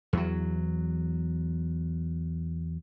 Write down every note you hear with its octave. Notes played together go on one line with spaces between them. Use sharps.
E2 F#3